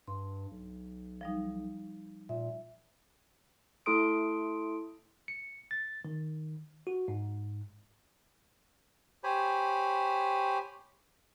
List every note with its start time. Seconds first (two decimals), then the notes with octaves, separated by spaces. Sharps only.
0.07 G2 C6
0.51 B1
1.21 F3 G3 D#4
2.29 A#2 E5
3.86 A3 E4 A4 C6 D#6 D7
5.28 C#7
5.71 A6
6.05 D#3
6.87 F#4
7.08 G#2
9.24 G4 C5 C#5 G#5 B5